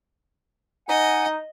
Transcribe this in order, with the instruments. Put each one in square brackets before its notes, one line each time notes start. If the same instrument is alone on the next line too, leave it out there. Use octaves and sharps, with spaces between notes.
[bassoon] D#4 [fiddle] D#5 [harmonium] F#5 G#5